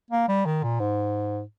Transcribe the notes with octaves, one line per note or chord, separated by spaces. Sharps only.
A#3
G3
D#3
A#2
G#2